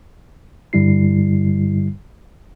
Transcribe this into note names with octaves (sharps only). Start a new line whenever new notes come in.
G2 D3 G3 E4 C7